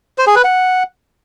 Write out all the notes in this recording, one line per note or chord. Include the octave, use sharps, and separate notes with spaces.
C5
G#4
B4
F#5